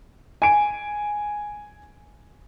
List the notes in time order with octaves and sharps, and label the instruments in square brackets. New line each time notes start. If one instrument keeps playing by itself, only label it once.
[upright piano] G#5 D7